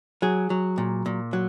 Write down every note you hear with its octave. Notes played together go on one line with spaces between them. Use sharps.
F#3 G#4
F#3
A#2
A#2
F#3